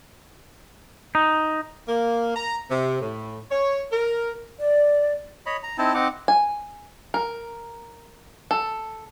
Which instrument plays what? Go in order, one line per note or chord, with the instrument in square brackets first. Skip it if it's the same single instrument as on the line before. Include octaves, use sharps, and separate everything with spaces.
[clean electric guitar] D#4
[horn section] A#3
A#5
C3
A2
C#5
A#4
[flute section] D5
[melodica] C#5 D#5 B5
A#5
C4 D#4 E4 A5
C4 D#4 F#5 D6
[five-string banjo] G#5
A#4
A4